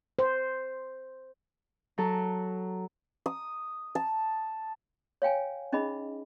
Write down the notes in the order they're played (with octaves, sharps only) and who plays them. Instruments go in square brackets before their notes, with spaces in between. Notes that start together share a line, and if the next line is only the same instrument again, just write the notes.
[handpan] C5
[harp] F#3 A4
[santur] D#6
A5
[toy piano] C#5 F5 G5 G#5
C#4 D#4 G#4 D#5 B5